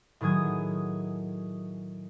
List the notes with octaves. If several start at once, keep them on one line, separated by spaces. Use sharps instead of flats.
A2 D#3 F#3 G#4 G#6